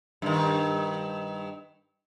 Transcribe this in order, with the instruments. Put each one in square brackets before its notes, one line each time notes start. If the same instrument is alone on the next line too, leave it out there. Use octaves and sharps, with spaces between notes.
[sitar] G2 D#3